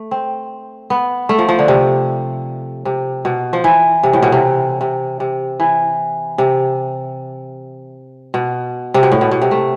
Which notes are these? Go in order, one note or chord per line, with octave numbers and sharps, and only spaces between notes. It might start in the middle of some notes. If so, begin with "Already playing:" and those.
Already playing: A3
C4
B3
A3
F3
F3
D3
C3
C3
B2
F3
E3
C3
A2
B2
C3
C3
C3
E3
C3
B2
C3
B2
A2
B2
B2
C3
A3